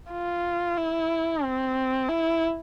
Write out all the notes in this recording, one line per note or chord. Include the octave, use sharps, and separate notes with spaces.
F4
E4
C4
E4